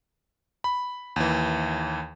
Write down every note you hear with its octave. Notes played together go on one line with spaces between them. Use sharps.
B5
D#2 E3